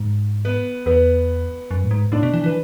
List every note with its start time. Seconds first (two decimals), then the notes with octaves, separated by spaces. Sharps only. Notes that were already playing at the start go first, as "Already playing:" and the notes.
Already playing: G#2
0.45 B3 B4
0.86 E2 B3 B4
1.71 F#2
1.84 A2
1.91 G#2
2.12 A2 D4 D5
2.23 B2
2.33 E3
2.44 E3 B4